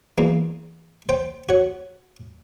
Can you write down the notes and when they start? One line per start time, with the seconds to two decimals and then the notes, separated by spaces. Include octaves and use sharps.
0.18 E2 A#3
1.09 C5 G5
1.49 F#4 C#5